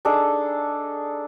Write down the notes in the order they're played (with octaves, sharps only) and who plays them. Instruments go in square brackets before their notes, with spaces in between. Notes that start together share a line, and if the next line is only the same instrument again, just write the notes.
[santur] D4 D#4 G#4 A4